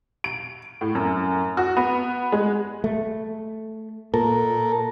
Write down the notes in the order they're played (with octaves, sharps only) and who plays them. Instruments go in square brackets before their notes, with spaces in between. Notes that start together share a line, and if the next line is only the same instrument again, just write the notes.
[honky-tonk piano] D7
A2
F#2
F#4
B3
G#3
[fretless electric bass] A3
[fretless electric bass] A#2 [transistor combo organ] A4 A#4